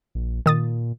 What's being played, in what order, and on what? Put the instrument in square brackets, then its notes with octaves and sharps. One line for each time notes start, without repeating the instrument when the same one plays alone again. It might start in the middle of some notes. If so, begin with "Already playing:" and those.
[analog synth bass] A#1
[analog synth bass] A#2 [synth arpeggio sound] D#3 D#6 A6